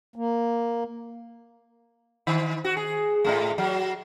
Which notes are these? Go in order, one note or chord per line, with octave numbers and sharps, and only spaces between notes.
A#3
D#3
F#4
G#4
A2 C3 A3
F#3